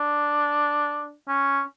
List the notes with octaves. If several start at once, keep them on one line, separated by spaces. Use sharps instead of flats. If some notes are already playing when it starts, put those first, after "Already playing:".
Already playing: D4
C#4